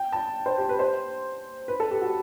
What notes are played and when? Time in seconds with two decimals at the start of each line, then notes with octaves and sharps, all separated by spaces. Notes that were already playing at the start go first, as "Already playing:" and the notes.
Already playing: G5
0.12 A5
0.46 C5
0.58 G4
0.69 B4
0.79 C5
1.68 B4
1.80 A4
1.91 G4
2.02 F#4